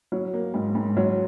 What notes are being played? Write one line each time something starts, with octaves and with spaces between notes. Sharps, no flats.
F#3
A#3
G#2
G#2
F#3